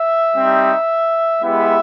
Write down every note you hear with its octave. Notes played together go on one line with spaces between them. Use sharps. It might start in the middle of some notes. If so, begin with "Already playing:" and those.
Already playing: E5
G3 C4 D#4
G#3 B3 E4 G4 E5